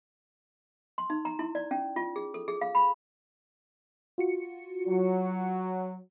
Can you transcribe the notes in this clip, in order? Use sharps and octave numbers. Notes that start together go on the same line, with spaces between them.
C6
D#4
A#5
E4
D5
C#4
F4
G#4
A4
G#4
F5
B5
F4 F#4 C#7
F#3